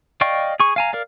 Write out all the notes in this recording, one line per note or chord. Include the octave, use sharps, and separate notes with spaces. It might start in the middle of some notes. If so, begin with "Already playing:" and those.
D5 D#5 F5 G5 C#6
G#4 C#6
F5 G#5 A#5
A#4 D5 F5